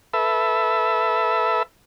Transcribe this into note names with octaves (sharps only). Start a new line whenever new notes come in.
A4 B4 E5